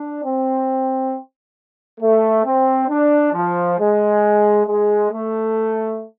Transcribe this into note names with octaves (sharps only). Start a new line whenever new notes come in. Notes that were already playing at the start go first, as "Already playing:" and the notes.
Already playing: D4
C4
A3
C4
D4
F3
G#3
G#3
A3